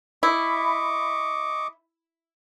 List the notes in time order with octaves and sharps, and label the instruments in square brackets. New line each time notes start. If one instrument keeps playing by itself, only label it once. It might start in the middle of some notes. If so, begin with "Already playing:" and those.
[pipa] E4 [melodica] D#5 C#6 D6